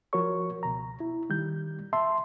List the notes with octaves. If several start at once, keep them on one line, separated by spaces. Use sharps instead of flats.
F3 F#4 A#4 C#5 C#6
C#2 B2 A#5
E4
D#3 G3 G6
E5 A5 C6